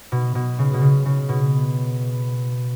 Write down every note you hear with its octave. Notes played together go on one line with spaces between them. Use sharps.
B2
B2
C#3
B2
C#3
C#3
B2